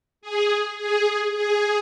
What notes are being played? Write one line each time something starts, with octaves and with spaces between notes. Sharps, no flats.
G#4
G#4
G#4
G#4